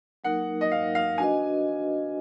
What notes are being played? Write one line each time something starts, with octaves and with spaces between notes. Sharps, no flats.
F#3 A#3 D#4 A#4 F#5
D#5
F5
F5
D4 F#4 B4 D#5 G#5